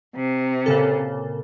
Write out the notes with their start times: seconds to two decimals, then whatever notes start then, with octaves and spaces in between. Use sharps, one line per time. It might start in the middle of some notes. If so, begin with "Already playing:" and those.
0.16 C3
0.66 A#2 C#3 A4